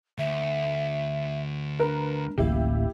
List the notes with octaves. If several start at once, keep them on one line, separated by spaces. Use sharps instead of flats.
D2 E5
D4 A#4 B4
D1 A1 A#3 E4 G4